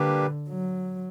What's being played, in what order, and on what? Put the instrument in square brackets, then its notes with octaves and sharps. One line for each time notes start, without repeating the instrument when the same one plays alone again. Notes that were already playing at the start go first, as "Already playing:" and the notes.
Already playing: [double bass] D3 [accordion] G3 A#3 D4 G4 B4
[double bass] F#3